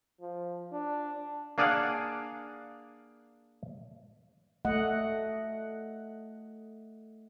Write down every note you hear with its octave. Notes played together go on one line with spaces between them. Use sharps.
F3
D4
A#3 D4 G#4 D5 F5 F#5
A3 D#5 F#5